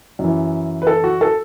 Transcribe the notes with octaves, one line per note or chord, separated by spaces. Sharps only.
F#2 E3
B4
A4
F#4
A4